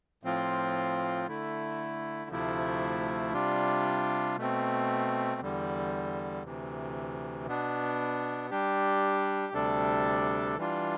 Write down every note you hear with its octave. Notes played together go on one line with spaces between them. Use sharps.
A2 F3 C4 F4
D3 A3 E4
D2 C3 F3 A3 E4
C3 G3 D4 F4
B2 A3 C4
E2 D3 G3
D2 C3 E3
B2 B3 D4
G3 D4 G4
D2 C3 G3 D4 A4
E3 G3 D4 F4